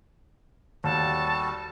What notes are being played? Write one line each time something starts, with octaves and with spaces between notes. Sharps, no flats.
D#2 G3 F#4 A4 A5